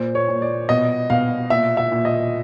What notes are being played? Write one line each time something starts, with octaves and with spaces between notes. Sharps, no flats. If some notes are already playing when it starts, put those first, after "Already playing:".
Already playing: A#2 C5
C#5
A#2
D5
B2 D#5
B2 F5
A#2 E5
E5
A#2
D#5